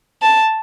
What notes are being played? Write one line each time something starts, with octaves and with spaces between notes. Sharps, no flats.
A5